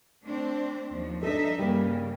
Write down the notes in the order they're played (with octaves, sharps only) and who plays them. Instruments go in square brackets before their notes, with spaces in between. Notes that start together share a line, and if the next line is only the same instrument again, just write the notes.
[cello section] A3 C4 D4
D#2 F3
[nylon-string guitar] D4 A4 [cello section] D#4 D#5 E5
[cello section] G2 C#3 [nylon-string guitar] G3 A#3